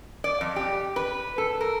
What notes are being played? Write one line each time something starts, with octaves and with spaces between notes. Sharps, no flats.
D5
F2
G4
B4
A4
A#4